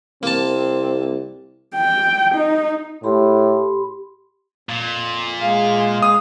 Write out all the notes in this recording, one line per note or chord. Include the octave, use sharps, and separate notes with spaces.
C2 A#3 C4 A5
G5
D#4
A2 G4 B5 C6
F2 A#2
G#3 G#4 F5
F5 D#6